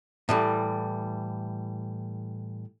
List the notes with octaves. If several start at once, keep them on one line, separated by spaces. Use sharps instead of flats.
A2 E3 G3